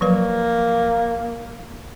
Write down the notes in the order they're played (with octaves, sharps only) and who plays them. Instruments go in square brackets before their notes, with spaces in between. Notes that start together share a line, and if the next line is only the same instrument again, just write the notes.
[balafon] F3 F#3 B4 [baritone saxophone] A#3